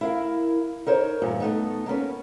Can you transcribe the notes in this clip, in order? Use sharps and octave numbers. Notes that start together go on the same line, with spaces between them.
E4 A#4 F5
D#4 A#4 C5 C#5
E2 G2 A#2
A3 B3 D#4
A#3 B3 C#4 B4